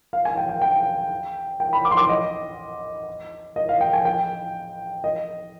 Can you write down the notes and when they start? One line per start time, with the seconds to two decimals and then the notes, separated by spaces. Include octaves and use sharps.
0.13 F5
0.25 G#5
0.37 G5
0.49 G5
0.62 G5
1.60 G5
1.73 B5
1.85 D6
1.91 C6
1.97 D6
2.09 D#5
3.56 D#5
3.69 F5
3.81 G5
3.93 G#5
4.05 G5
5.04 D#5